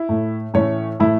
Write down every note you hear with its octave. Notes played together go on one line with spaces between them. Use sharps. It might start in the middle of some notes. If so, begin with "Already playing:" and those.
Already playing: E4
A2 A3
A2 E3 A3 C#4 C#5
A2 E3 A3 E4